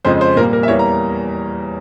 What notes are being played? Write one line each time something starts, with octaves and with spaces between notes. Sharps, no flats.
F2 C#3 F3 G#3 C4 C5
C5
A#2 G3 A#3 A#4
A#4
E5
E2 E3 G3 A#3 C#5
A#5